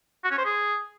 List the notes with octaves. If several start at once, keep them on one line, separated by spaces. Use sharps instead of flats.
F#4
C#4
C5
G#4